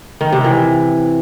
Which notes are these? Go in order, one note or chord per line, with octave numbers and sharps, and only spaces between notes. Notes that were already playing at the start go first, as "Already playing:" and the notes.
D#3
C3
E3